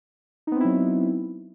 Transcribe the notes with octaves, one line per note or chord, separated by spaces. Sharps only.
F#3 B3 C4 D#4 E4